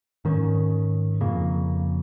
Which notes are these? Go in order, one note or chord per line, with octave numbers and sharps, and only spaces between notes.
G#2 D#3 C#4
F2 C#3 A#3